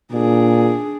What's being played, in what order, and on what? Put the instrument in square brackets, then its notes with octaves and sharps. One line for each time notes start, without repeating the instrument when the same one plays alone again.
[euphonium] A#2 [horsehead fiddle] D4 G#4